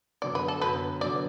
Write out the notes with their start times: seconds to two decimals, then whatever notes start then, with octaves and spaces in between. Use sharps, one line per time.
0.22 F#2 D3 F#3 B3 D5
0.35 B4
0.48 A4
0.62 F#2 D3 F#3 B3 B4
1.01 F#2 D3 F#3 B3 D5